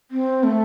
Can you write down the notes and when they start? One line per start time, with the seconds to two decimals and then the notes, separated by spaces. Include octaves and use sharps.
0.11 C4
0.44 A3